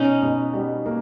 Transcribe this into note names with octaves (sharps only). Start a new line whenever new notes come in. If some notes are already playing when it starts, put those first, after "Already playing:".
Already playing: B2 C#4 D#4
B2
G3
A#3